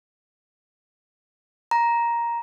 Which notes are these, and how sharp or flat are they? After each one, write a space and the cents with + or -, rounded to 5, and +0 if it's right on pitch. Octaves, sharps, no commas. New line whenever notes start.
A#5 +10